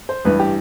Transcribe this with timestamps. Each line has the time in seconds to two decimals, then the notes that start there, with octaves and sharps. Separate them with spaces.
0.09 C5
0.25 A1 G2 E3 B4
0.39 G4